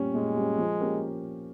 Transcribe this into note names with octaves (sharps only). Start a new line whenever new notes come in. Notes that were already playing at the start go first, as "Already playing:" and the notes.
Already playing: A#2 G3 C#4
A#2 G#3
G3 C#4
F3
A#3 C#4 G4 A#4